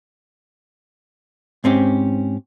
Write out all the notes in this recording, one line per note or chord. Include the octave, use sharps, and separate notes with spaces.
G#2 C4 C#4 G4